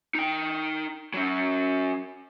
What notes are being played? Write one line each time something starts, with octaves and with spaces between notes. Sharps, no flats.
D#4 G5
F#3 C#4